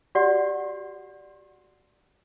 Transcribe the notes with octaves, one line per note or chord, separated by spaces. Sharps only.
F#4 G4 D5 F#5